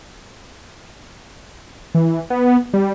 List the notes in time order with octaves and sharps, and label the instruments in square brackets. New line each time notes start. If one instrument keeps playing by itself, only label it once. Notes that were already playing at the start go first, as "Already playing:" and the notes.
[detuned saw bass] E3
B3
G3